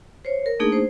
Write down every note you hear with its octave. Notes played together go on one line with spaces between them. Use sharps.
C5 C#5
A#4
A3 A#3 D4 D#4 G#4
C5